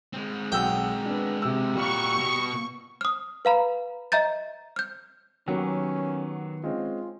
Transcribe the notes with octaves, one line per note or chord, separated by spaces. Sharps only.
G#3 C4
B1 F#5 G5 E6
B3 D4
C3 E6
A#2 G3 F#4 C#6
B2
D#6 F6
B4 F5 A#5 B5
D#5 E5 A#5 G6 A6
F6 G6
D#3 F#3 A#3 B3 C#4 G4
G#3 C4 C#4 F4